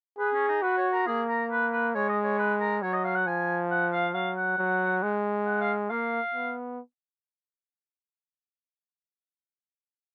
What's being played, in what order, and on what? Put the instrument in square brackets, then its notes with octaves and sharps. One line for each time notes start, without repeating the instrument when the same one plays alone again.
[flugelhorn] G#4 [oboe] B4
[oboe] C#4
D#4
[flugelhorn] F#4 [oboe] B4
[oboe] C#5
A#4
[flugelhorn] A#3 [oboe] G#4
[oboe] A#4
B4
B4
[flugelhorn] G#3 [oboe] C#5
[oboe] D#5
C#5
B4
A#4
[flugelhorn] F#3 [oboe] C#5
[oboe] D#5
F5
F#5
[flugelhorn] F3 [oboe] G#5
[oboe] F#5
F5
[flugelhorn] F#3 [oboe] F5
[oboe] F#5
[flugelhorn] F#3
G#3
[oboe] F#5
F5
[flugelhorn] A#3 [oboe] F5
[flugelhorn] B3